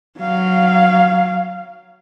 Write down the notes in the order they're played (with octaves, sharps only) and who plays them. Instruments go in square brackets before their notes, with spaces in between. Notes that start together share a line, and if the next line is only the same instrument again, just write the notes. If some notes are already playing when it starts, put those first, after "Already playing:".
[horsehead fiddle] F#3 F5